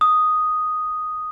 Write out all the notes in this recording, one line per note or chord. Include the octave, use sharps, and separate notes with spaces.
D#6